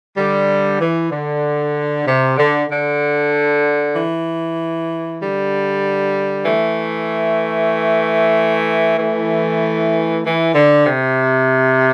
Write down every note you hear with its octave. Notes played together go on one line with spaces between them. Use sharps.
D3 G3
E3
D3
C3
D3
D3
E3
D3 G3
E3 A3
E3 A3
E3
D3
C3